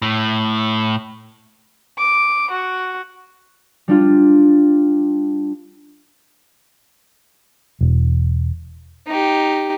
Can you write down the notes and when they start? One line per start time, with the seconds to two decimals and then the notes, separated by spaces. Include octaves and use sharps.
0.02 A2
1.99 D6
2.51 F#4
3.88 G3 D4 F4
7.81 E1
9.07 D#4 G4